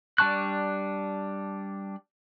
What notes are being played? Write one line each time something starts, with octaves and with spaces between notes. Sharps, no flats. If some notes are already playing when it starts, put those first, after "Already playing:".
G3 D4 A5 C#6 F#6